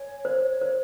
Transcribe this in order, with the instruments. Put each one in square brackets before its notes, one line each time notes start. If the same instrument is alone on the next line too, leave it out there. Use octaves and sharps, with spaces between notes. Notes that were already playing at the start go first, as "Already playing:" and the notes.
Already playing: [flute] C#5 [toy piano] G#5
[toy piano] C5
C5